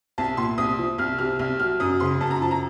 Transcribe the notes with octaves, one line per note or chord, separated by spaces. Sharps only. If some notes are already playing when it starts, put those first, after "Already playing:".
C2 A5
A#2 C6
C2 D#6
F3
C2 F6
C3 F6
C2 F6
F#3 F6
F#2 D#6
C#3 C6
F#2 A5
A#5
F3 A5
A#5